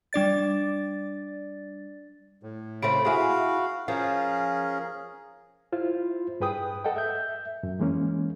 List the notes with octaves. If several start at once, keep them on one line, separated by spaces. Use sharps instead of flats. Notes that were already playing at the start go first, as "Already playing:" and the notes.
G3 D4 D5 A6
A2
C#3 A3 C4 B5 D7
E4 F#4 G#4 F5
F3 C#4 G#4 A#4 F5
E4 F4 C5
G2 G#4 B4 G5 D#6
A4 D#5 F#5 G5
E5 G6
F#2
E3 G#3 A#3 C#4